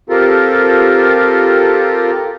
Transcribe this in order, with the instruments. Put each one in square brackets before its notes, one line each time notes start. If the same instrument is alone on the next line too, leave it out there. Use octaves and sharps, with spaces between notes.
[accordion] C4 F4 G4 A4 A#4